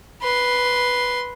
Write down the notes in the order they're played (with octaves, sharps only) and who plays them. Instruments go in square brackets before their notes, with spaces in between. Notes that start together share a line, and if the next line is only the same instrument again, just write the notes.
[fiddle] B4 C6